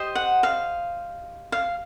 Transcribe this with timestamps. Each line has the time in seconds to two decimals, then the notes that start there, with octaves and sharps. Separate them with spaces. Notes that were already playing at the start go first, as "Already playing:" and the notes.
Already playing: G4 C5 D#5
0.15 F#5
0.43 F5
1.52 F5